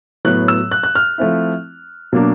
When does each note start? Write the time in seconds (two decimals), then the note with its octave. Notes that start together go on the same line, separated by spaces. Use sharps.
0.25 A2 F#3 B3 F#6
0.48 E6
0.71 F#6
0.83 F#6
0.95 F6
1.18 F3 A3 C4 E4
2.13 B2 F#3 A#3 D4